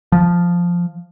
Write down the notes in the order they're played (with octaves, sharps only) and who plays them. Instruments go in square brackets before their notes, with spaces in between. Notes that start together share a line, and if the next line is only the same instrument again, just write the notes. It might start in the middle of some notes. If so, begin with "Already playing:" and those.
[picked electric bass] F3